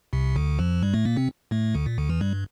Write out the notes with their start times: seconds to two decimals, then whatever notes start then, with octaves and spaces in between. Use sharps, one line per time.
0.13 C2 C3
0.36 D2 D3
0.59 F2 F3
0.83 G2 G3
0.94 A2 A3
1.05 A#2 A#3
1.16 C3 C4
1.51 A2 A3
1.74 D2 D3
1.86 A#2
1.98 D2 D3
2.09 E2 E3
2.21 G2 G3